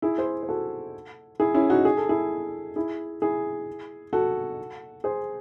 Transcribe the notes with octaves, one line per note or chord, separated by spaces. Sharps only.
E4 G#4
G#4 C5
C5
F#4 A4
E4 G#4
C#4 E4
D#4 F#4
G#4
A4
E4 G#4
E4 G#4
E4 G#4
F#4 A4
G#4 C5